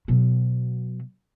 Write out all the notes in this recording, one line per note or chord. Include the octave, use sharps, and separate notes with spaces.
B2 F#3